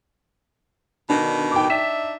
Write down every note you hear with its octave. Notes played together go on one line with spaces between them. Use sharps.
B2 D3 D#3 D4
G5 D6
D4 D#4 E5 B6 E7